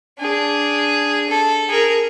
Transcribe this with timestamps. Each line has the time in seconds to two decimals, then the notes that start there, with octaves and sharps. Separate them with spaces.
0.19 D4 G#4
1.29 A4
1.69 G#4 A#4